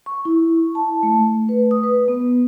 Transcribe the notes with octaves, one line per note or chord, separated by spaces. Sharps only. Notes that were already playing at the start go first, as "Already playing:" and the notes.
C#6
E4
A5
A3
B4
D#6
B4
B3